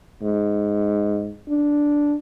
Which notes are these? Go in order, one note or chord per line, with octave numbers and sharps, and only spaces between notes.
G#2
D4